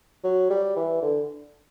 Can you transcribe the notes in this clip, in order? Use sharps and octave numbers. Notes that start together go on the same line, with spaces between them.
F#3
G3
E3
D3